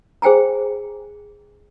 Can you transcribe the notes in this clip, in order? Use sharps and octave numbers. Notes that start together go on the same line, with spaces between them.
G#4 C5 G5 G#5 A#5